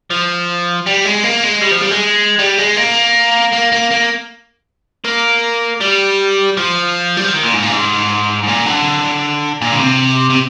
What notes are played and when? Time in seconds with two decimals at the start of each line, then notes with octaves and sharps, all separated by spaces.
0.11 F3
0.87 G3
1.05 G#3
1.24 A#3
1.44 G#3
1.62 G3
1.72 F3
1.82 G3
1.91 G#3
2.39 G3
2.58 G#3
2.77 A#3
3.52 A#3
3.72 A#3
3.91 A#3
5.05 A#3
5.81 G3
6.57 F3
7.17 G3
7.25 F3
7.34 D#3
7.43 A#2
7.52 G#2
7.62 A#2
7.71 G#2
8.44 G#2
8.48 A#2
8.66 D3
9.61 A#2
9.72 D3
9.80 C3
10.30 C3